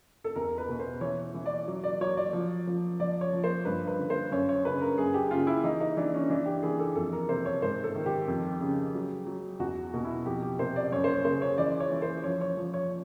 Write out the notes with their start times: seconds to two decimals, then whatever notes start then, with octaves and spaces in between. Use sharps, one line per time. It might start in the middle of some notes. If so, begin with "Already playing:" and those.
0.24 A4
0.36 E2 A#4
0.58 B4
0.69 B2
0.79 C5
1.01 E3 C#5
1.34 E3
1.46 D5
1.68 F#3
1.84 D5
2.01 F#3 C#5
2.17 D5
2.33 F3
2.67 F3
3.00 F3 D5
3.21 C#5
3.33 F3
3.44 C5
3.65 G2 B4
3.88 B4
3.99 D3
4.10 C5
4.31 F#2 C#5
4.49 C#5
4.65 C#3 B4
4.81 A#4
4.97 F#2 G#4
5.14 G4
5.31 C#3 F4
5.47 E4
5.64 E3 D#4
5.80 D#4
5.97 E3 D4
6.14 C#4
6.30 E3 D4
6.46 G4
6.63 E3 G#4
6.80 A4
6.95 F2 A4
7.12 A#4
7.29 C3 C5
7.46 C#5
7.62 G#2 C5
7.84 A4
7.95 D#3
8.06 G4
8.28 F2
8.61 C#3
8.94 F#3
9.27 F#3
9.60 E2 F#4
9.93 B2
10.05 E4
10.26 F2 G4
10.42 G4
10.59 C3 C5
10.76 D5
10.92 F#2 C#5
11.04 C5
11.08 C#5
11.25 C#3 C5
11.42 C#5
11.58 E3 D5
11.80 C#5
11.92 E3
12.02 C5
12.24 F3 C#5
12.41 C#5
12.57 F3
12.74 C#5